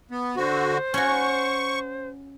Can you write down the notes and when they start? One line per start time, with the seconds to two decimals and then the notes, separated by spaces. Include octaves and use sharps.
0.11 B3
0.36 D3 F#4 C5
0.94 C#4 F#4 C#6